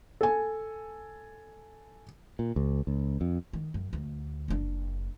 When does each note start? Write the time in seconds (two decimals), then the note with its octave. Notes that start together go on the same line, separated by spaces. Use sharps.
0.21 A4 G#5
2.39 A#2
2.56 C#2
2.87 C#2
3.21 F2
3.53 D#3
3.74 F#2
3.93 D2
4.48 F#1 D4